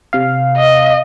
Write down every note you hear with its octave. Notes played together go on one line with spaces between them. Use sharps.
C3 F5
D#5